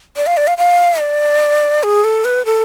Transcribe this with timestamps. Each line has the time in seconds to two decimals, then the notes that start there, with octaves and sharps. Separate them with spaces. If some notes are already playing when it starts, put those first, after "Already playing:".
0.16 D5
0.26 F5
0.37 D5
0.47 F5
0.58 F5
0.99 D5
1.83 G#4
2.04 A4
2.25 B4
2.45 A4